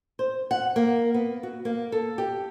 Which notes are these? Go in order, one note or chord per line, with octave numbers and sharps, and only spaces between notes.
C5
F#5
A#3
B3
F#4
A#3
A4
G4